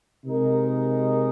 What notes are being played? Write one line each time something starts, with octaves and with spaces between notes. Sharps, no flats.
C3 G#3 D#4 A#4